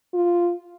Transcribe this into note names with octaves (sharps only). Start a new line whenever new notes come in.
F4